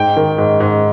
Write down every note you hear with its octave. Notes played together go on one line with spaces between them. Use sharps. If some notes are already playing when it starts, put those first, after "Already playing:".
Already playing: G#2 G5
D#3
G#2
G#2